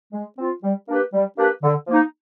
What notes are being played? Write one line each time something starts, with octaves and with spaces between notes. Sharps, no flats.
G#3
C4 F4
G3
A#3 D4 G4 B4
G3
A#3 D4 G4 B4
D3
F3 A#3 D#4